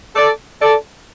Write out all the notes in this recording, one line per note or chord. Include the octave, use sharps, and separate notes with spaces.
A4 D5
A4 D5